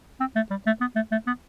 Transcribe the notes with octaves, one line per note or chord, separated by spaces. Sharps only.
C4
A3
G3
A3
B3
A3
A3
B3